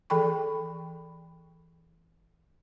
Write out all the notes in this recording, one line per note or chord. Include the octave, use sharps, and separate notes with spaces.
E3 G#4 A4 G5 B5 C#6